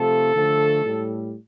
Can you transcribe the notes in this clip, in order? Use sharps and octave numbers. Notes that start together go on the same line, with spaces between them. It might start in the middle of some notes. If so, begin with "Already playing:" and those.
Already playing: C3 F3 A3 A4
D3 F3 A3
A2 G3